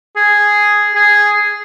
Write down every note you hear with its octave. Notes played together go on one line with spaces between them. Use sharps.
G#4
G#4